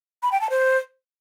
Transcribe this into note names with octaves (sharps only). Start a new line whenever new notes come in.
B5
G5
A5
C5